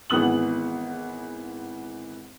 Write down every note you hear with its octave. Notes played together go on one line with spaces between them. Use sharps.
G#1 E3 B3 D#6 F#7